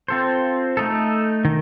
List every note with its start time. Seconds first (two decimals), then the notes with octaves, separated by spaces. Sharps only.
0.08 C4 F4 A4 C5
0.77 A3 D#4 A4
1.45 D#3